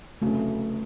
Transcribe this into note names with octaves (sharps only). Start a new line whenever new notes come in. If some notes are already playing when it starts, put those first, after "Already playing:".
F1 F2 C#3 F#3 A3